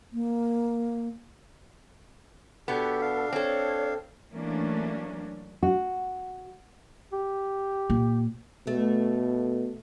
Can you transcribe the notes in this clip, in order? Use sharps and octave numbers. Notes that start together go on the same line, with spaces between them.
A#3
B2 B3 D4 G4 A4
D4 F5
C4 A4 C#5
E3 F#3 A3 A#3 C#4 D4
F#4
G4
A#2
B2 A3